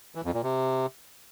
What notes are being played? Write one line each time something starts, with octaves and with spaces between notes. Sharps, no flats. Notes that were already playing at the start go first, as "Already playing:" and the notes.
E3
F2
A#2
C3